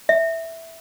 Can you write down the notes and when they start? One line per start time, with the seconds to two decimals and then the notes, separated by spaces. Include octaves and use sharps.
0.09 E5